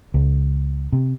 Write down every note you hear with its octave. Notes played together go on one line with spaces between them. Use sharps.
C#2
C3